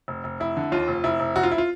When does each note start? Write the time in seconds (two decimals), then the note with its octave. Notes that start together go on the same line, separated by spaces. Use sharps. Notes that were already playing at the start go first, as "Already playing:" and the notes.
0.08 F1
0.24 F1
0.40 F1 E4
0.57 D3
0.72 D#2 F4
0.88 F1
1.04 F1 E4
1.20 F1
1.36 F1 F#4
1.43 F4
1.51 E4
1.58 F4